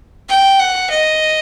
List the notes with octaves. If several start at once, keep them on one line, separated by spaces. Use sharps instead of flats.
G5
F#5
D#5